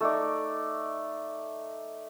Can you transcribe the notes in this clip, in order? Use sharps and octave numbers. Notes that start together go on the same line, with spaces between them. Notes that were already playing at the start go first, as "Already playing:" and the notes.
A3 D#4 D5